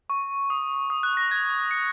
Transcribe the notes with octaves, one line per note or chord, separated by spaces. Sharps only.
C#6
D#6
D#6
F#6
A#6
G#6
C#7